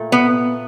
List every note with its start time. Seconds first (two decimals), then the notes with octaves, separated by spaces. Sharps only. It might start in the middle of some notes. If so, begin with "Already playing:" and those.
Already playing: A#2 A3
0.12 B3